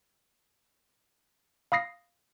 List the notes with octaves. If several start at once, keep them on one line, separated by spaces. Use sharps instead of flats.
F5 B5 D#6 A#6 C7